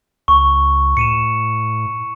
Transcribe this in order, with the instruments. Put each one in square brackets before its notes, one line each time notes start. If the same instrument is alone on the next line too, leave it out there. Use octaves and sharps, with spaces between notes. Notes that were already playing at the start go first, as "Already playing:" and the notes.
[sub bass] C#2 [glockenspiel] C#6
[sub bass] A2 [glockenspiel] C#7 D#7 E7